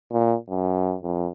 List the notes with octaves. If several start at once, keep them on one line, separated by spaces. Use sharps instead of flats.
A#2
F#2
F2